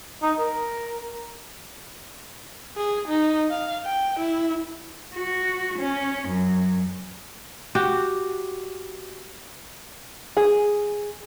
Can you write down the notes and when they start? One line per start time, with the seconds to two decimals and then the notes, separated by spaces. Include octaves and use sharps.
0.22 D#4
0.39 A#4
2.77 G#4
3.08 D#4
3.50 F5
3.85 G5
4.19 E4
5.15 F#4
5.78 C#4
6.28 F#2
7.75 F#4 G4
10.37 G#4